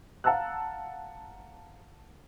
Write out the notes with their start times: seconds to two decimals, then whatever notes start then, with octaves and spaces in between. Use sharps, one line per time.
0.24 F5 F#5 A5 A#5 E6 F#6